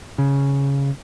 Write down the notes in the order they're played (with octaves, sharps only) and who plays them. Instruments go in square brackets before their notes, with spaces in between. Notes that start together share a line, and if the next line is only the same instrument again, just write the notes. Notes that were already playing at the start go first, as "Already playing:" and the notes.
[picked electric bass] C#3